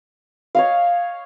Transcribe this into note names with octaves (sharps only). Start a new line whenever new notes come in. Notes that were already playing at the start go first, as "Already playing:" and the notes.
C#5 D#5 F5